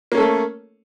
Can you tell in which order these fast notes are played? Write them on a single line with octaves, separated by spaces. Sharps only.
A#3 C#4 A4 A3